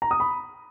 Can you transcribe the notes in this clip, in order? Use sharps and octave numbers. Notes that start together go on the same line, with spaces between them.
A#5
D#6
B5